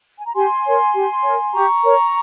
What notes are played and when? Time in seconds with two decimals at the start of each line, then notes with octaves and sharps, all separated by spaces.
0.18 G#5
0.26 A#5
0.34 G4 G#5 C6
0.65 A#4 C#5
0.94 G4
1.24 A#4 C#5
1.52 G4 A#5 C#6
1.83 A#4 C#5